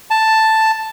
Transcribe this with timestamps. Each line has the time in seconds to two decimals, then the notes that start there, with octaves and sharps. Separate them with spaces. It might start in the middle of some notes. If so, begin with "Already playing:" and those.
0.10 A5